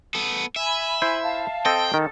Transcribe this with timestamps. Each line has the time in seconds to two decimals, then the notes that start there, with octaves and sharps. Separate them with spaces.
0.15 B3 A4
0.56 E5 G#5 B5
1.02 E4 C5
1.22 F5 A5
1.66 C4 A4 D#5 G5
1.94 D#3 A4